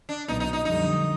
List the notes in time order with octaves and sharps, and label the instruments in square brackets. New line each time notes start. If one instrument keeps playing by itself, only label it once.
[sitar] D4
[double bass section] B1 A#2 F#3 B3 [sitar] D#4
[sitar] D#4
D#4
[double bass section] F2 D3 G3 [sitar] D#4